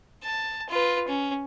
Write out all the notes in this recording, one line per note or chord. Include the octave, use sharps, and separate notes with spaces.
A5
F4 B4
C#4